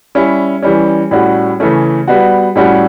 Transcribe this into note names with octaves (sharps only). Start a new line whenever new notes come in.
G3 C#4 E4
E3 G3 C#4
A2 G3 C#4 F#4
C#3 E3 A3 C#4
G3 B3 F#4
A2 G3 C#4 F#4